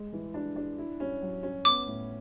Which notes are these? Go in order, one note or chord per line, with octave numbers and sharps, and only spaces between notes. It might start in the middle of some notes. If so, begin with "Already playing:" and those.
Already playing: G#3
E3
D4
D4
E4
C#4
F#3
C#4
B3 D6
A2